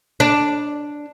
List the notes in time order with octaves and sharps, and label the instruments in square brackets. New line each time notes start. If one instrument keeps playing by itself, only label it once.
[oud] D4